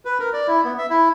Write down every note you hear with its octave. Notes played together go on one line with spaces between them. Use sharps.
B4
A#4
D5
E4
B3
E5
E4